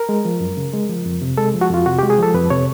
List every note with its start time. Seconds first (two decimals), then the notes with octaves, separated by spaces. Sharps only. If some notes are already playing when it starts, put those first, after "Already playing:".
Already playing: A#4
0.09 G#3
0.25 F3
0.41 F#2
0.57 C#3
0.73 G#3
0.89 F3
1.06 F2
1.22 C3
1.38 G#3 A4
1.54 F3
1.61 F#4
1.70 F2 F4
1.86 C3 F#4
1.99 G#3 G4
2.10 G#4
2.18 F3 A4
2.34 F2 B4
2.50 C3 C#5